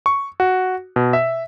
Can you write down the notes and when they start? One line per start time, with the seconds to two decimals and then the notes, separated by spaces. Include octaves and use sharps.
0.06 C#6
0.40 F#4
0.96 B2
1.13 E5